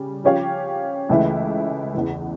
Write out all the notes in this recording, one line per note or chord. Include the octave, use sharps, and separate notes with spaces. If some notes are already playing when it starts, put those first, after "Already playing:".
Already playing: C#3 G3
F3 C#4 G4 C#5 F5
C#2 C#3 E3 A3 E4
E2 C#3 E3